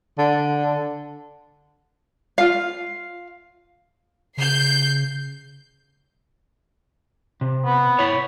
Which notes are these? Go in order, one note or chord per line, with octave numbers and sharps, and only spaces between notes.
D3
F4 F5
C#3 G6 C7
C3
B3
E4 C#5